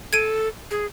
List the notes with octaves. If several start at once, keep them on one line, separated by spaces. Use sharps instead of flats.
A4 G#6 D7 D#7
G#4